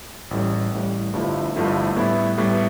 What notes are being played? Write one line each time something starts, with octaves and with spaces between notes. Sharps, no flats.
A1 A2 G3
A1 A2 G3
G1 G2 F3 A3 E4
G1 G2 F3 A3 E4
A2 G3 B3 E4
A2 G3 B3 E4